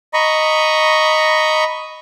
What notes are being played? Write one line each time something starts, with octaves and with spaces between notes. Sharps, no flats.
D#5 A#5 B5 C#6